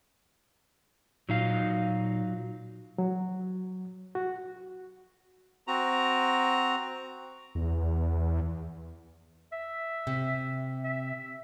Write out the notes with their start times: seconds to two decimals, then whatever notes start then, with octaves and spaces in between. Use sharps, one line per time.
1.29 A#2 F#3 D#4 F5
2.98 F#3
4.15 F#4
5.67 C4 F#4 A#5
7.55 E2
9.52 E5
10.07 C3
10.84 E5